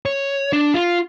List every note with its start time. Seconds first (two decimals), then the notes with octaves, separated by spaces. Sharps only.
0.06 C#5
0.53 D4
0.74 F4